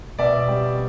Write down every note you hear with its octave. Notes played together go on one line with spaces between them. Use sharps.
B2 D5 E5
G3 C4